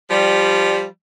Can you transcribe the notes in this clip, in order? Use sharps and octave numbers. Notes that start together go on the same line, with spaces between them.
F3 G3